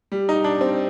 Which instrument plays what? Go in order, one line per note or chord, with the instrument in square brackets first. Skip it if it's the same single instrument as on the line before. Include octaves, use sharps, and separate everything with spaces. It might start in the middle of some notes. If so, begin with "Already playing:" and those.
[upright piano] G3
D#4
D4
C4